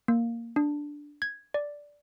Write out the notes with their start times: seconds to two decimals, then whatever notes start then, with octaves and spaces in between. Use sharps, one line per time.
0.08 A#3
0.56 D4
1.22 G#6
1.54 D5